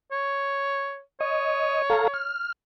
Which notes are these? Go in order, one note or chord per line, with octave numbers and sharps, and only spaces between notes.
C#5
C#5 D#5
A4 F5 A#5
F6